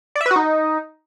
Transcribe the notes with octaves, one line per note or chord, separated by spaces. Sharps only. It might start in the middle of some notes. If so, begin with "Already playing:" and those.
D5
E5
B4
F#4
D#4